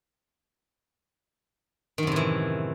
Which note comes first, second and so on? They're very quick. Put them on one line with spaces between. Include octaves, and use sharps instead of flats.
D#3 F#2 C3 A2 E3